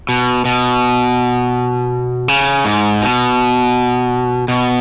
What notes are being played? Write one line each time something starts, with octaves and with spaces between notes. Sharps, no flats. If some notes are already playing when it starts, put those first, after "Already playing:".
B2
B2
C#3
G#2
B2
B2